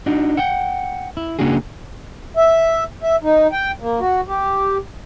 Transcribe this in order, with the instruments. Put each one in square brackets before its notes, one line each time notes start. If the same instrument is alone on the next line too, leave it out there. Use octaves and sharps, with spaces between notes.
[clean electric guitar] D4 D#4 F#4
F#5 G5
E4
C#3 F#3 A#3 D4 F#4 G#4
[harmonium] E5
E5
D#4
G5
A#3
F#4
G4